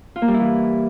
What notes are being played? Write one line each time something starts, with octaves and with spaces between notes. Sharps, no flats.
F4
A#3
G3
E4
E3